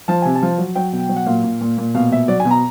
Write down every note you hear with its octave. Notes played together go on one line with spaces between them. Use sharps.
F3 A5
C3 G#5
A5
F3
F#3
F#3 G5
B2
F#3
F#5
A#2 F5
A#2
A#2
A#2
B2 F5
B2 E5
F#3 D5
G#5
B2
A#5